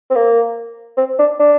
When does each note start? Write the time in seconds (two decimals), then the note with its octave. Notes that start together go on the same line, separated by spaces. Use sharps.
0.10 C4
0.15 A#3
0.97 C4
1.19 D4
1.39 D4